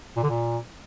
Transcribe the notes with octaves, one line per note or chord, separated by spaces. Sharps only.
A#2
D3
A#2